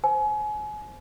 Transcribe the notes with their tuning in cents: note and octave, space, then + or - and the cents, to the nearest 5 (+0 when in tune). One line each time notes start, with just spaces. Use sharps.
C5 +0 G#5 +30